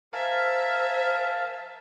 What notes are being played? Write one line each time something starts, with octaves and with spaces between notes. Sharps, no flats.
A#4 C5 E5 F5 G#5 A5